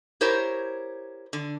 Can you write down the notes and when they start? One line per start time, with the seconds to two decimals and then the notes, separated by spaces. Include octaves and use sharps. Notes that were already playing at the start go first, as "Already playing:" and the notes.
0.21 E4 G4 A#4 C5 C#5
1.33 D3